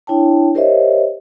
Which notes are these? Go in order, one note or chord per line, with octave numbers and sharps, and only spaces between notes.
D4 E4 C#5 G5 A5
G4 A#4 C5 C#5 D#5 E5